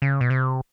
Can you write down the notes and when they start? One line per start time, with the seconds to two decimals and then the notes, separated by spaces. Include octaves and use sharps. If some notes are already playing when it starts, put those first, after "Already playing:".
0.02 C#3
0.21 B2
0.30 C3